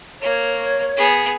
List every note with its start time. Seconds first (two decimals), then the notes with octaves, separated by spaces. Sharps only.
0.21 A#3 C#5
0.96 B3 G#4